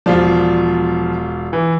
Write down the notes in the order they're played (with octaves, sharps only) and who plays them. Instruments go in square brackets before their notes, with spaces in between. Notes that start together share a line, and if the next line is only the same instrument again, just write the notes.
[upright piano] E1 F4 D5 [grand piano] F3
[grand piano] E3